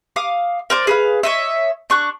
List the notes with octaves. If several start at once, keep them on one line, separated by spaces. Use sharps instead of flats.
F5 D6 D#6
A#4 C5 D5
G#4 B4 F5
C#5 D#5 E5
D4 C#6 F#6